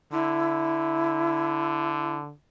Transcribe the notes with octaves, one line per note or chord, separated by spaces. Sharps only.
D3 E4